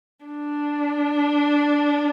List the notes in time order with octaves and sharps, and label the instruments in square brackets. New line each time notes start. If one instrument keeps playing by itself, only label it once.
[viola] D4